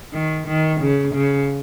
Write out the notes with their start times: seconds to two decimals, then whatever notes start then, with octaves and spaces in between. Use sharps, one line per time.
0.13 D#3
0.47 D#3
0.80 C#3
1.14 C#3